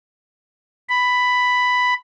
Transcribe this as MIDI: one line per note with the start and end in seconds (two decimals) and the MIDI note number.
0.89 1.94 83